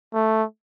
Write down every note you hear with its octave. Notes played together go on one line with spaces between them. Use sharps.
A3